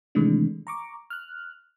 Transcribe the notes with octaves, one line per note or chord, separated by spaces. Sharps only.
C3 D#3 E3 G#3 A3 D4
A#5 C#6 D6
F6 F#6